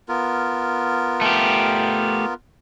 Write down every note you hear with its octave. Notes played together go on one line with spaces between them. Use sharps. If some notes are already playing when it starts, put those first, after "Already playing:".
B3 F4 A#4
A3 G4